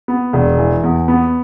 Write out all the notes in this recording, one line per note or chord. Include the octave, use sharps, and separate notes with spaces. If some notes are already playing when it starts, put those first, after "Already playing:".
B3
E1
E3
E2
B3